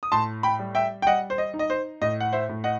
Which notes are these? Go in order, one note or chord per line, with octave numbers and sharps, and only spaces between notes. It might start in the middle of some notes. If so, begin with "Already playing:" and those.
D#6
A2 A5 C6
G5 B5
G3
E5 G5
G5
G3 D#5 F#5
C5
D#5
D#4
D#5
C5
A2 D#5
F#5
C5 E5
A2
D#5 F#5